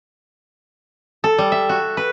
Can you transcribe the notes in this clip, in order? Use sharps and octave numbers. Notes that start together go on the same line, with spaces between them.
A4
G3
E5
F#4
B4